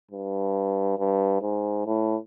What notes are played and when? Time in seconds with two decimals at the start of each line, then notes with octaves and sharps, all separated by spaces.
0.11 G2
0.98 G2
1.42 G#2
1.86 A2